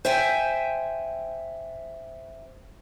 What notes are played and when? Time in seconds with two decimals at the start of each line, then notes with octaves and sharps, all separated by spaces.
0.05 C5 E5 G5 G#5